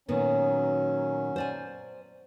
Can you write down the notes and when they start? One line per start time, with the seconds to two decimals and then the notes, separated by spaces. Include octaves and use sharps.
0.08 A#2 D#3 F#3 B3 C#4
1.36 C5 D5 G#5